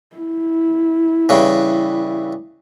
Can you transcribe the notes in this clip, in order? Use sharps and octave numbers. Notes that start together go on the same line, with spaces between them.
E4
G2 C#3 E3